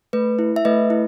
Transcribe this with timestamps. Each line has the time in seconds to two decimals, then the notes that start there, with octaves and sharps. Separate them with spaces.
0.13 A3 B4
0.39 E4
0.56 E5
0.65 A3 B4 D#5
0.90 E4